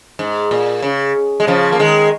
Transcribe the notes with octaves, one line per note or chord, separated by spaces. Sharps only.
G#2
A#2
C#3
G#3
C#3 F3
A#3
D#3 G#3